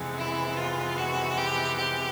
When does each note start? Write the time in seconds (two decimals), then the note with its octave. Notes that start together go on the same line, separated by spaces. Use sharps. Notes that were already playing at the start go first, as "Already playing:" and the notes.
Already playing: F2 C3 E3 G#3 B3
0.18 E4
0.57 F4
0.98 F#4
1.38 G4
1.77 G4